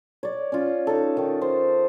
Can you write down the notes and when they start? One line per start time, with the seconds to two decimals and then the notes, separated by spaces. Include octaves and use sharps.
0.23 C#5 D5
0.52 C#4 F4
0.87 D#4 A4
1.17 D#3 D#4
1.42 C5